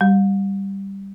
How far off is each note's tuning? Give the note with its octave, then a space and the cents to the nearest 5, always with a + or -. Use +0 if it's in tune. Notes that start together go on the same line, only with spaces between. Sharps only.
G3 +0